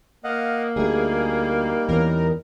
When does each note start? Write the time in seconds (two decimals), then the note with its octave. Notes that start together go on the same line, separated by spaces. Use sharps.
0.24 A#3 D#5 F5 F#5
0.76 D2 G3 A3 D#4 G#4
1.89 E2 E3 C#4 A#4